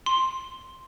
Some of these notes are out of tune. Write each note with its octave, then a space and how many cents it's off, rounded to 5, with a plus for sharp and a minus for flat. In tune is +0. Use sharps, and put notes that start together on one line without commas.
C6 +5